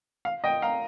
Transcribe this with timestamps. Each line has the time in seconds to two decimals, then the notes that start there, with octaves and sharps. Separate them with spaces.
0.25 F5
0.44 D#5 G5
0.62 F5 A#5